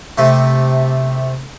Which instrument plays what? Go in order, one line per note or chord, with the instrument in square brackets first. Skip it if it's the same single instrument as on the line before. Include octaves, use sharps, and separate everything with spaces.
[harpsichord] C3 A3